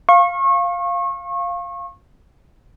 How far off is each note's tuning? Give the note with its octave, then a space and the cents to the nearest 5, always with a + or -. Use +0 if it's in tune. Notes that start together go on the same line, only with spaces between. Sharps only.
F5 +0 C#6 -30